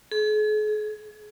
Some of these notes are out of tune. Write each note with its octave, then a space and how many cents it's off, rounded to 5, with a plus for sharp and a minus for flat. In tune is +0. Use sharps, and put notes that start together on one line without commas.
G#4 +45
G#4 +10